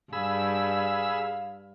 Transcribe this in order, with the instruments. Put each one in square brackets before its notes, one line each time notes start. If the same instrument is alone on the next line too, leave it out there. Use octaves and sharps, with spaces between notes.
[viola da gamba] G2 [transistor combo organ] G#4 B5 E6 [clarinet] F5